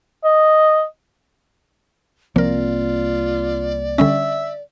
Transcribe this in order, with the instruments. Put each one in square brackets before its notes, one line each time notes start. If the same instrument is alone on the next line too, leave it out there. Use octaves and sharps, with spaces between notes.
[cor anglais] D#5
[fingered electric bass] C2 A#3 C4 [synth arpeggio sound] F3 A#4 [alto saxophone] F4 [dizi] D5
[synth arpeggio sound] D3 G3 C#4 [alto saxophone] E5